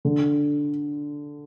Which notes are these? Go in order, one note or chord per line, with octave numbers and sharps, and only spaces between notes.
D3